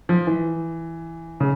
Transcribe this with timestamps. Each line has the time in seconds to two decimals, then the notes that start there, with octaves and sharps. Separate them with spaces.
0.09 F3
0.27 E3
1.40 C#3